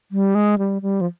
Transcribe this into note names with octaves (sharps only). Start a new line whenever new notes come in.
G3
G#3
G3
G3
F3